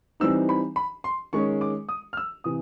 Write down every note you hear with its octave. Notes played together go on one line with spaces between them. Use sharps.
E3 G3 C4 D#4 E6
B5
B5
C6
D#3 G#3 C#4 C#6
D6
D#6
F6
E6
C3 E3 D#6